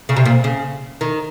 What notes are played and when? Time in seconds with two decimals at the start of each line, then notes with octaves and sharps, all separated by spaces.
0.09 C#3
0.17 C3
0.25 A#2
0.44 C#3
1.01 D#3